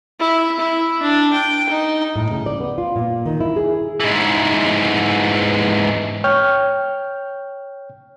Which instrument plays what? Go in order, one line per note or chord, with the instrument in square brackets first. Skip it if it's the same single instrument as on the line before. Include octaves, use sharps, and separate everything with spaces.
[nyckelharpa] E4
E4
D4
G5
D#4
[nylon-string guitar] A2
C#3
D5
B3
F4
A#2
D#3
E4
G#4
[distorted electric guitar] G#2 E3
[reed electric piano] C#5 G5 F6 G6